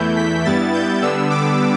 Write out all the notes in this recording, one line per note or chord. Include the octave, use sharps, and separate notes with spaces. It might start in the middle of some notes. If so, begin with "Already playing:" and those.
Already playing: E2 E3 A3 E4 G6
B6
G2 G3 B3 E4 A6
G6
D3 G3 B3 D4 E6
D6